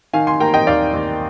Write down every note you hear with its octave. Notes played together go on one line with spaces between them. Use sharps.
D#3 F5 G#5
G#5 C6
A#3 G5 A#5
D#5 G5
D#2 D5 F5
D#2